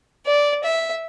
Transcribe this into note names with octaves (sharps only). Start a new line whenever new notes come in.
D5
E5